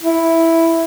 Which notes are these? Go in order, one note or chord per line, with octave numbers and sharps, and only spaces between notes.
E4